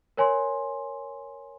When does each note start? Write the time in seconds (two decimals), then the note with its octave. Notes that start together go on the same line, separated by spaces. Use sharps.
0.17 A#4 C#5 G#5 C6